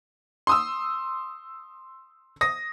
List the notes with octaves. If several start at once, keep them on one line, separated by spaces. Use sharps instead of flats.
C6 D#6 E6
D#6 A#6